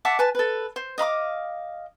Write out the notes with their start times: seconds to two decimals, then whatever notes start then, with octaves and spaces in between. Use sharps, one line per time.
0.05 E5 F#5 A5 D6
0.19 B4 G#5 A5
0.35 A4 B4
0.76 C5
0.98 D#5 F5 B5 D6